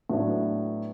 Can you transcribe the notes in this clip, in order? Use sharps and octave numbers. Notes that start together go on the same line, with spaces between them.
A2 F#3 B3 D4